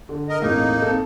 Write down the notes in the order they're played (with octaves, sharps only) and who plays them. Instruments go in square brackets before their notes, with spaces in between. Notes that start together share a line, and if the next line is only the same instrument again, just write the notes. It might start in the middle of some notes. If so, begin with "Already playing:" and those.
[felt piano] D3
[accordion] A#4 D#5
[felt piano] E1 A2 C3 [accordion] A#3 D#4
[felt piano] C4 A4